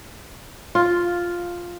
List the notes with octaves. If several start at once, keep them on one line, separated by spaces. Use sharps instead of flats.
F4